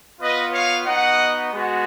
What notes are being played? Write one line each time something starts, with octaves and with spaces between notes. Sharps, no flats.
B3 F4 B4 D#5
C#5 F5
B3 D#4 F#4 D#5 F#5
G#3 B3 F#4